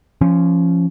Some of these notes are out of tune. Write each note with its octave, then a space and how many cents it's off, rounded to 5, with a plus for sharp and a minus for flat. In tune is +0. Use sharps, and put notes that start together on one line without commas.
F3 -20 C#4 +0